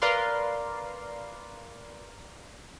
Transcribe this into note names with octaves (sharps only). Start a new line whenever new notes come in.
A#4 B4 D5 F5 C6